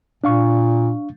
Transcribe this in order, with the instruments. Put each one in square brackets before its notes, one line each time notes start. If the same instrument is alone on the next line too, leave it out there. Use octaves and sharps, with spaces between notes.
[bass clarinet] A#2 [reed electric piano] D4 F5 C#6